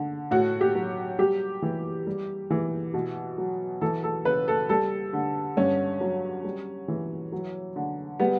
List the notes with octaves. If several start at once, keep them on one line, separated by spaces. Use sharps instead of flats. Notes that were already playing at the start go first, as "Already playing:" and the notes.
Already playing: D3
A2 F#4
G4
F#3
G3 G4
E3
G3
E3
B2
F#3
E3 A4
A4
C#3 B4
A4
G3 A4
D3
G2 C#4
F#3
G3
E3
F#3
D3
G3 B3